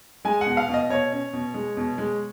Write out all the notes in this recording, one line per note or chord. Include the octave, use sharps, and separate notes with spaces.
G#3 G#5
F#5
B2
F5
B2
D#5
B2 C#5
C#4
B2
G#3
B2
G#3